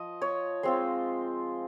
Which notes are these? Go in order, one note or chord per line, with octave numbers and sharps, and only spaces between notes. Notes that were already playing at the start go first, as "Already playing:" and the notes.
Already playing: F3 D#5
C#5
G#3 C4 F4 C5